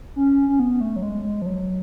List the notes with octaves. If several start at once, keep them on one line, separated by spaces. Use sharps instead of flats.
C#4
C#4
B3
A3
F#3
G#3
G#3
F3
F#3